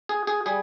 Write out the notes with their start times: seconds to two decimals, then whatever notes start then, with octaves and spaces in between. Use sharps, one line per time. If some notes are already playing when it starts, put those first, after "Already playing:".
0.09 G#4
0.27 G#4
0.46 G3 G#4